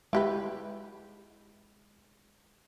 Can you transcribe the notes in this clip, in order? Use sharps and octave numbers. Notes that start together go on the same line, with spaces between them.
G#3 E4 G4 B4